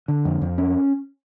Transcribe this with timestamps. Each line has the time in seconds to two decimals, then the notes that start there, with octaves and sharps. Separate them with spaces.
0.08 D3
0.25 F2
0.42 F2
0.58 C#4